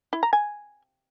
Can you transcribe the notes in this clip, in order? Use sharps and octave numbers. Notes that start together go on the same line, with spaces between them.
E4
A#5
G#5